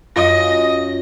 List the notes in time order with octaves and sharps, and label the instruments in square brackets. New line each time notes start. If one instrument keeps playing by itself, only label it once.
[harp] F#2 [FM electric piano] F4 A#6 [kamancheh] D#5